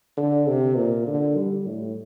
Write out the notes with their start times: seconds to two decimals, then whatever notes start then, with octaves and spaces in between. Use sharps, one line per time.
0.17 D3
0.47 C3
0.77 A#2
1.07 D3
1.37 G3
1.67 A2